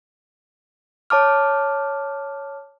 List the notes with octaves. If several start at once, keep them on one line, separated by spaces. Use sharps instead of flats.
C#5 A5 D6 F6